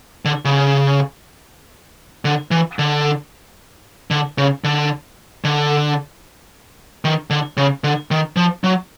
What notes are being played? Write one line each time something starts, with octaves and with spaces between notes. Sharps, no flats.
D3
C#3
D3
E3
D3
D3
C#3
D3
D3
D#3
D3
C#3
D3
D#3
F3
F#3